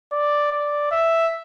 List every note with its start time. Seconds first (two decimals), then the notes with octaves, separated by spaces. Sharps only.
0.12 D5
0.52 D5
0.91 E5